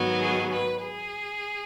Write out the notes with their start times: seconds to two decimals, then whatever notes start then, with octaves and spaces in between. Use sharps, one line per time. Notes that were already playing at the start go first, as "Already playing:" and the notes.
Already playing: G#2 D#3 F#3 B3
0.20 G#4
0.51 B4
0.82 G#4